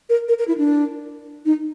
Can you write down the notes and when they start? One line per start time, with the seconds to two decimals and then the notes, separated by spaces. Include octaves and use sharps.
0.10 A#4
0.28 A#4
0.39 A#4
0.48 E4
0.58 D4
1.45 D#4